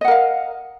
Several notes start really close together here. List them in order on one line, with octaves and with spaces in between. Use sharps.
D#5 F#5 A#4 F5